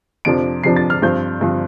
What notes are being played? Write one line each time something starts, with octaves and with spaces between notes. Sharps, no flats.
F2 C3 F3 D4 D7
F2 C3 F3 D4 C7
A6
F6
G2 F3 C4 G6
G2 F3 C4